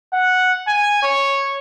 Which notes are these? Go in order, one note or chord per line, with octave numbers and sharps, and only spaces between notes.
F#5
G#5
C#5